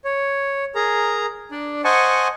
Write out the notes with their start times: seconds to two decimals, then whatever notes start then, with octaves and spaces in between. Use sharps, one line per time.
0.04 C#5
0.75 G#4 A#4 A#5
1.51 D4 D5
1.84 C5 D#5 F#5 G#5 A5 C#6